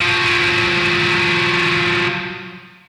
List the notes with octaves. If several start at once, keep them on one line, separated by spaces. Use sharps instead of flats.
F3 F#3